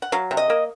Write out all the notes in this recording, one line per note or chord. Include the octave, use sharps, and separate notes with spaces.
F#5
F#3 F5
C3
D#5
A#3